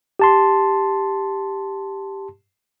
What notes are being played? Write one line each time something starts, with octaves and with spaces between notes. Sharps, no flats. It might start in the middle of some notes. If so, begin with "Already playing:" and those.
G4 A5 C6